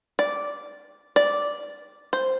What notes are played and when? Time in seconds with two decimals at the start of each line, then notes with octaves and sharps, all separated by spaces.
0.19 D5
1.16 D5
2.13 C5